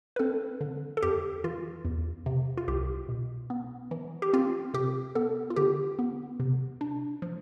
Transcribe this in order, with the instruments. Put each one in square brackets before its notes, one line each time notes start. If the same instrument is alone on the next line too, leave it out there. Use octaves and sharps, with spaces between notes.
[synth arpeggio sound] B4
C4 A4
D3
A4
F2 G4
E3 F4
E2
C3
F4
C2 G4
B2
B3
E3
G4
C4 F4
C3 G4
B3 A4
F4
D3 G4
B3
C3
D4
F3